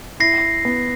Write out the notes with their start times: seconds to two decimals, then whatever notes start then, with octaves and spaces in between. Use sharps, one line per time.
0.20 E4 A#6 C7
0.65 B3